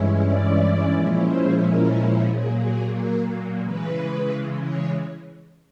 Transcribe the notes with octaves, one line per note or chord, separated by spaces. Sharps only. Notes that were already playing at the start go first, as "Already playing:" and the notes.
Already playing: G2 E3 G#3 C#4 E4
D5
A#2 F3 G#3 C#4 E4
C5
A#4
A#2 F#3 A#3 G#4
G#4
A#4
C#3 E3 G#3 B4
C#5